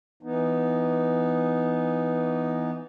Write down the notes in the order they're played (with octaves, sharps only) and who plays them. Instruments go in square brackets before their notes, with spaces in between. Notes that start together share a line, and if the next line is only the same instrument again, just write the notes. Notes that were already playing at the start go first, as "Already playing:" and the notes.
[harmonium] E3 B3 D#4